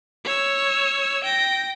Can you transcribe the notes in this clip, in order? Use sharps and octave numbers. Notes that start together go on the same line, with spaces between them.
C#5 E6
G5 A#6